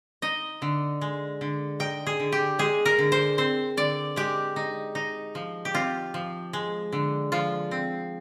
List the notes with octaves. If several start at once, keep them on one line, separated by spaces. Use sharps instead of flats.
D#4 D#5
D3
G#3
D3
D#4 G5
G#4
D3
G4
G#3 G#4
A#4
D3
C5
C4 C5
D3 D5
G#3 G4
D#4
D#4
F3
G4
C4 F4
F3
G#3
D3
F3 F4
C4